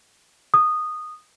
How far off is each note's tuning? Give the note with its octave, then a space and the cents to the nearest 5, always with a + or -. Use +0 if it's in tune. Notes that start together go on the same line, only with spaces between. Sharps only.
D#6 -15